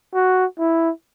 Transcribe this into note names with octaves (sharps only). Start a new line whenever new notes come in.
F#4
E4